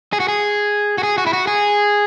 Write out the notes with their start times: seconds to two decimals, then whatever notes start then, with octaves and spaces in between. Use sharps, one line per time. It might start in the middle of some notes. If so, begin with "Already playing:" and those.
0.13 G#4
0.20 F#4
0.28 G#4
0.98 F#4
1.03 G#4
1.18 F#4
1.27 E4
1.33 F#4
1.47 G#4